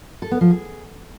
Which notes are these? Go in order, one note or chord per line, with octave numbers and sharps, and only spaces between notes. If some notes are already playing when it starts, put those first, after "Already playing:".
A4
B3
F3
G#4